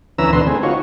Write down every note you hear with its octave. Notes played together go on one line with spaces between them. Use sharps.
D2 E3 C#4 B4 A#5 E6
D2 B2 D3 B4 C6
A3 C4 G#4
D#4 F4 F#4 C#5